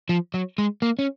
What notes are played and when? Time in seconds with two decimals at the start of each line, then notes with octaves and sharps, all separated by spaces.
0.09 F3
0.34 F#3
0.58 G#3
0.82 A#3
0.99 C#4